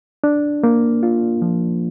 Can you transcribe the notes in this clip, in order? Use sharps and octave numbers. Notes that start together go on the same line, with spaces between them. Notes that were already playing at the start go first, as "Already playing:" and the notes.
D4
A#3
F4
F3